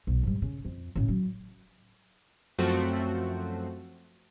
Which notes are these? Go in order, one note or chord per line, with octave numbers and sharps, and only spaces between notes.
B1
G#2 G3
C#3
F2
A2 C#3
F#3
F#2 F3 A3 C4 F#4